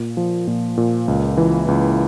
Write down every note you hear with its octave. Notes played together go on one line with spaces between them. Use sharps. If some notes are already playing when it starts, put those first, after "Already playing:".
Already playing: A#2
F3
A#2
A#2
C#2
E3
C#2